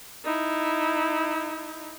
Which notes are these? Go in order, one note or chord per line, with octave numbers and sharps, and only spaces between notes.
D#4 E4